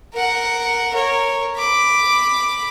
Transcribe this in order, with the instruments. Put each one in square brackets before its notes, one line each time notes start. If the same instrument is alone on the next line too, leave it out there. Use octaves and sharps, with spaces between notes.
[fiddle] A#4 F#5
A#4 C#5
B5 D6